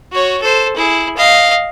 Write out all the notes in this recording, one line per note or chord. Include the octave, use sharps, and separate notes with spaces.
F#4 C#5
A4 C5
E4 G#4
D#5 F5